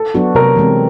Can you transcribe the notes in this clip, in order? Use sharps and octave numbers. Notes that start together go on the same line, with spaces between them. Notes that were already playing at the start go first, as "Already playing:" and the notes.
Already playing: A4
F#3 B3 D4 F#4
C3 A#4
E3 G#3 C4